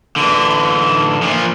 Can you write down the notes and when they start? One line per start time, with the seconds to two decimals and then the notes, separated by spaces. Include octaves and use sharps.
0.16 D3 E3
1.22 A#2 F3